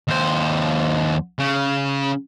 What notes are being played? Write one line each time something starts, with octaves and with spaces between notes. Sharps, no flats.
D#2 C5
C#3